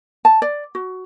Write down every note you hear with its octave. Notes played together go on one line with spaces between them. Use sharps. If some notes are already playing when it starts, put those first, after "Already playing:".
A5
D5
F#4